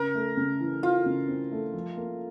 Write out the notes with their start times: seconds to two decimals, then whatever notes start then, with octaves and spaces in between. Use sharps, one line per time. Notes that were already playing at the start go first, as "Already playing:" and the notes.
Already playing: C#3 A#4
0.14 A3
0.37 C#3
0.60 E3
0.83 E3 F4
1.06 C#3
1.28 C4
1.52 A3
1.73 F3
1.97 A#3